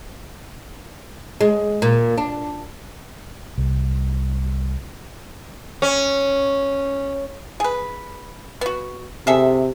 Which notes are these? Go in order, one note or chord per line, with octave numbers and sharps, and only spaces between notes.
G#3
A#2
D4
C2
C#4
G#4 B4
B3 F#4
C3 G#4 A4 E5